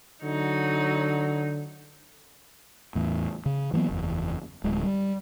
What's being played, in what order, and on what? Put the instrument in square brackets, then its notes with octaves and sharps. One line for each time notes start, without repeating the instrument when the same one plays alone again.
[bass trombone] D3 [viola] F#3 D#4
[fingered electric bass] E2 A2
C#3
E3 F#3 A#3 B3
F#1 E2
D1 G#3
G3